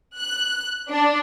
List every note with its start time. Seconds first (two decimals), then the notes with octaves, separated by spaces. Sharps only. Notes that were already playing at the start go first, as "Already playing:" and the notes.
0.18 F#6
0.90 D4